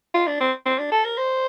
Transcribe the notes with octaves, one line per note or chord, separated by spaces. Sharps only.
F4
D4
C4
C4
D4
A4
A#4
C5